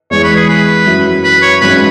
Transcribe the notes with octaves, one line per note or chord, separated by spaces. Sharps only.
E2 E3 G#3 C#5
B4
G#4
B4
F#2 F#3 E4
B4
C#5
G#1 G#2 F#3 C#4 B4